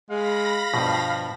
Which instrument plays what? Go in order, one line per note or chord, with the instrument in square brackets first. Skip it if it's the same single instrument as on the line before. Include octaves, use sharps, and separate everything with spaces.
[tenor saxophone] G#3 [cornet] F5 [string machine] B5 A#6
[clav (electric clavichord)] G2 B2 [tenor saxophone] F3